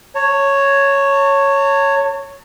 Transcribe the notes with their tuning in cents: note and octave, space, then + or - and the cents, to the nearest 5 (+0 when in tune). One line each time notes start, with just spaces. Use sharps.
C#5 +0 A5 +40